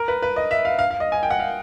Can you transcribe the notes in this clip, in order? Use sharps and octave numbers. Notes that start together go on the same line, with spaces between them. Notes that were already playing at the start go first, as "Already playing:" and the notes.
Already playing: A#4
B4
B4
D#5
E5
F5
F5
F5
D#5
G#5
G5
F#5
F5